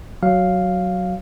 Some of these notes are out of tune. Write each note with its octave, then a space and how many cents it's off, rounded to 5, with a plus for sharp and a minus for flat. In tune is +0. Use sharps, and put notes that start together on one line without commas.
F#3 +5 F5 +0